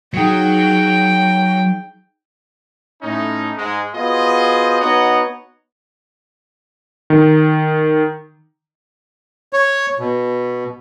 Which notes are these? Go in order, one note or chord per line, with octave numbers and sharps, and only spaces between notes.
F#3 D#4 G#4 C#5 G5
A2 C#4 D#4
G#2 G#3
B3 F4 F#4 G#4 C5 D#5
B3 D#4 F#4 C#5 D#5 F#5
D#3
C#5
B2